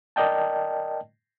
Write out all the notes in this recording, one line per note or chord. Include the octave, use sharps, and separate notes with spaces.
A#4 D5 D#5 G5 A5